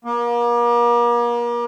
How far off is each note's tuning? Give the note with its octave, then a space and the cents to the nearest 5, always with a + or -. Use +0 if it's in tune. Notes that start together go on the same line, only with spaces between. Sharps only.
A#3 +40